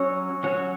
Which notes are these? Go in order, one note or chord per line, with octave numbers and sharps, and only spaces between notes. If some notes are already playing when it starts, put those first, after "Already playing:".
Already playing: F#3 C#4 F#4 C#5 C#6 E6
F#3 C#4 F#4 C#5